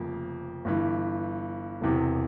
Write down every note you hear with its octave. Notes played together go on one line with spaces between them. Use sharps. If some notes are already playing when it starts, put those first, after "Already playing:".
Already playing: F1 F2 C#3 F3 A#3
G1 G2 E3
E1 E2 C3 E3